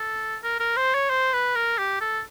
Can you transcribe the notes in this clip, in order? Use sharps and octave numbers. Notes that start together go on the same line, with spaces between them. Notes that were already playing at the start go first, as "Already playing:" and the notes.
Already playing: A4
A#4
A#4
C5
C#5
C5
B4
A#4
G4
A4